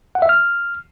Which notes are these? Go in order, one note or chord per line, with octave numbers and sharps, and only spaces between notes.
F#5
E5
F6